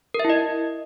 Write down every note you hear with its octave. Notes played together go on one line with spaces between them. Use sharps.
A#4
E5
E4
D#5